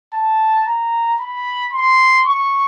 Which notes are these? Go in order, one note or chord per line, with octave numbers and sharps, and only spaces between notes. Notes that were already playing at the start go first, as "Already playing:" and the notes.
A5
A#5
B5
C6
C#6